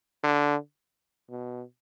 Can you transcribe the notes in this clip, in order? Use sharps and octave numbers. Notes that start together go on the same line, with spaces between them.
D3
B2